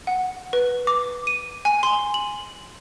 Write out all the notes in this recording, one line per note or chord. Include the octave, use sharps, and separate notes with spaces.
F#5
B4
D6
D#7
G#5
C6
F#7